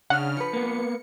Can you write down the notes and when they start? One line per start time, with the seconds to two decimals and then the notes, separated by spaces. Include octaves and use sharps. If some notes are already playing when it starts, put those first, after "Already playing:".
0.10 C#3 D4 F#5 F6
0.37 F3 B4 C#7
0.53 A#3 B3